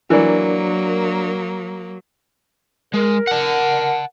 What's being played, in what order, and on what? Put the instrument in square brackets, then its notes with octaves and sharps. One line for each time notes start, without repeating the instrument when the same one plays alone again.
[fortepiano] E3 [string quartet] F#3 A#3 [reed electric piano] D4 A#4 D5
[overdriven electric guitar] G#3 [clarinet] A#4
[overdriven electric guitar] F#5 A5